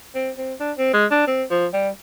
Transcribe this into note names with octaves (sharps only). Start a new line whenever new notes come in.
C4
C4
D4
C4
G#3
D4
C4
F3
G3